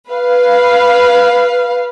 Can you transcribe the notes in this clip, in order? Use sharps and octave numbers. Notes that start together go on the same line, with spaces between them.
B4 F5